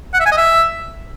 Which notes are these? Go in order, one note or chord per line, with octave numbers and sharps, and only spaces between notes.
F#5
E5
G#5
D#5
E5